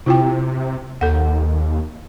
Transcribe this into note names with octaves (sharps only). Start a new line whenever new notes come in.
C3 E4 F4 G5
D#2 A4 F#5